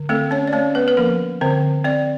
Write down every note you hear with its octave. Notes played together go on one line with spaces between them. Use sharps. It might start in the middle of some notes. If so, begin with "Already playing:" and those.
Already playing: D3
A3 C4 A4
C#4 C#5
D5
A3 C#4 C#5
B3 B4
B4
F3 A#3 A#4
D3 C4 C5
C4 D5